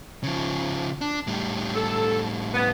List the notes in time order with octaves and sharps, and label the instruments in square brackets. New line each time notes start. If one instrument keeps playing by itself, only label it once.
[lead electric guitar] C#3 F3
D4
A2 G3
[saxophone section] A4
B3